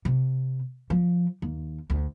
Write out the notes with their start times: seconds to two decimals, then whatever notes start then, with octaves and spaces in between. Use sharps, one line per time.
0.05 C3
0.90 F3
1.42 D#2
1.90 D2